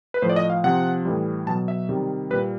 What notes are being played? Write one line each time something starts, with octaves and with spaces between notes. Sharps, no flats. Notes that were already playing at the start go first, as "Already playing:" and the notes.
B4
A2 F3 C5
D5
D#5
F5
C3 F3 F#5
A2 E3 G3
B2 F#3 A5
E5
C3 D#3 G3
A#2 G3 B4